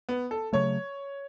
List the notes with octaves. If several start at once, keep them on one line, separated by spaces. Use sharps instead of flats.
B3
A4
C#3 F#3 A3 C#5